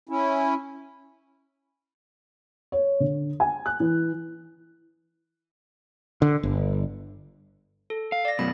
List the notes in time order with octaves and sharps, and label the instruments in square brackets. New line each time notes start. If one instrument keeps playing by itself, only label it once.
[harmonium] C#4 E4
[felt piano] C#5
D3
G#5
F#6
E3
[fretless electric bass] D3
G1
[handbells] A4
[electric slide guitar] F5
[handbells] D5 A#6
[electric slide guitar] F#2 B2 [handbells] B5